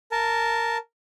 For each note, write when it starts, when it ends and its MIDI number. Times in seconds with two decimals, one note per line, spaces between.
0.12 0.77 70
0.12 0.77 81